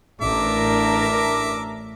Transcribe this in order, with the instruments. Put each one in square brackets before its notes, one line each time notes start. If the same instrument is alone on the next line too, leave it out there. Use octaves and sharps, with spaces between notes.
[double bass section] A1 [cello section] D4 A#4 [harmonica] E5 D6